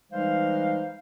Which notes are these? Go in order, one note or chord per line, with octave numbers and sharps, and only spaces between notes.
E3 G3 G#3 D#4 C5 F5